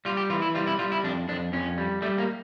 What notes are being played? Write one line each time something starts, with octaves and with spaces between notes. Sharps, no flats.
G3 F4
G4
E3 F4
E4
G3 F4
E4
G3 F4
E4
F2 D4
F2 D4
F2 C#4
G3
G3 A3
A#3